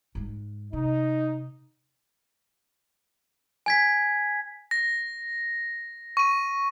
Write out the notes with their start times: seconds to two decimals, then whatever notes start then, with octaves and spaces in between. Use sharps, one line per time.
0.15 G#2 G#3
0.73 C3 D#4
3.66 G#5 G#6 B6
4.71 A#6
6.17 C#6 D#7